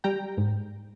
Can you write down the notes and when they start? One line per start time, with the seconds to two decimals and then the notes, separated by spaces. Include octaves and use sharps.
0.04 G3 G5 A#5
0.37 G#2